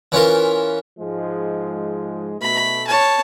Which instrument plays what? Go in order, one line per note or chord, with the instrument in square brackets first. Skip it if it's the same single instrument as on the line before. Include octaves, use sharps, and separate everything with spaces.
[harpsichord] E3 C#4 F4 A#4
[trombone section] G#2 F3 G#3
[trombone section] B2 A3 [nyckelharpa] B5
[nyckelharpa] C#5 A5